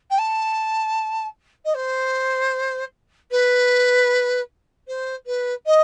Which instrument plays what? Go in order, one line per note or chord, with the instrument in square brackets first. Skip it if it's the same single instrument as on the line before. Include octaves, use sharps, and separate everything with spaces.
[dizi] G5
A5
D#5
C5
B4
C5
B4
D#5